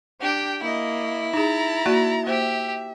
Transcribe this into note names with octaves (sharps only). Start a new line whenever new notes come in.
D4 G4 G5
A#3 E4 D#5
D#4 G#4 A#5 A6
A#3 F#4 D5
A#3 G4 C5 E5